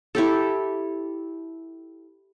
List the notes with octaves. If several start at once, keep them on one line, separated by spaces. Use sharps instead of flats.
E4 G4 A4